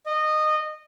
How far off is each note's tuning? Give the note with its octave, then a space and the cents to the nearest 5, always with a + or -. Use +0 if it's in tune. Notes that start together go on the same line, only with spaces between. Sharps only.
D#5 -20